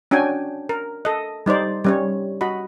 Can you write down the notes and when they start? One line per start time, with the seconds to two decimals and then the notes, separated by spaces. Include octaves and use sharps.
0.11 C#4 D4 F#4 G5 G#5
0.69 A#4
1.05 A4 D#5
1.46 G3 D#4 C5 D5
1.84 G3 C#4 C#5
2.41 F#4 D#5 B5